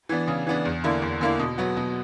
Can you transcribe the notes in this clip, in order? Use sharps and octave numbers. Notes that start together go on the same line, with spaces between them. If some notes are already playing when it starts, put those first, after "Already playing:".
E3 B3 D4
C#3
E3 B3 D4
E2
D3 A#3 E4
E2
D3 A#3 E4
B2
F#3 B3 F#4
B2